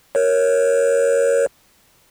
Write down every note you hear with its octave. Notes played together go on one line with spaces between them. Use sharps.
A#4 C#5